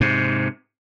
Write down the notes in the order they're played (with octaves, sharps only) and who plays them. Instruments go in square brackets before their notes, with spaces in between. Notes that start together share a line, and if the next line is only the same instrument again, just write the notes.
[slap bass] G#2 C3